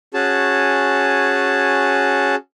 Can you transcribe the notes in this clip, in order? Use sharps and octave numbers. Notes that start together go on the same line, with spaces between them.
C#4 F#4 G#4 A5